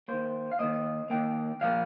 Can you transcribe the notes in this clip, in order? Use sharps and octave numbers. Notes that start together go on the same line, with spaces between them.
D#3 A#3 C5
F5
D#3 A#3 D#5
D#3 A#3 G5
A#2 F3 A#3 F5